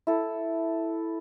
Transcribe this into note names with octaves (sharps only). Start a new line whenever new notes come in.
E4 A4